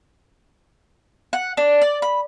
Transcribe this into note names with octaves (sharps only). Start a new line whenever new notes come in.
F#5
D4
D5
B5